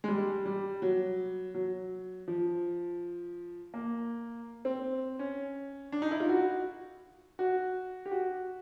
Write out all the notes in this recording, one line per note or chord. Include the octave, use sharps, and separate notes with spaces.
G#3
G3
G3
F#3
F#3
F3
A#3
C4
C#4
D4
D#4
E4
F4
F#4
F#4
G4
F#4